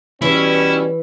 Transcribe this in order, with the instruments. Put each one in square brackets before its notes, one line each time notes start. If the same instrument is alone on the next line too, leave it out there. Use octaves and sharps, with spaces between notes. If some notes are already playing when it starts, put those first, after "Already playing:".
[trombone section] B2 G3 C#4 [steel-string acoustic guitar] E3 [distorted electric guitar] E4